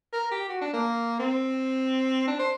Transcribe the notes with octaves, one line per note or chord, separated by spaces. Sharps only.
A#4
G4
F#4
D4
A#3
C4
D4
C5